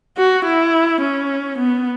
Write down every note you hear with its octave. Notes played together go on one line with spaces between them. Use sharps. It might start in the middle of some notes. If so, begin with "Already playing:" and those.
F#4
E4
C#4
B3